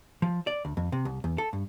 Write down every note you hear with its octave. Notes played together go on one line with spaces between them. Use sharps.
F3
D5
D2
F2
C3
C2
E2
A4
G2